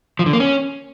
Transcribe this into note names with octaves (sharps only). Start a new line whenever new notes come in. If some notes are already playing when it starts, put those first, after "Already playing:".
F3
D3
A#3
C#4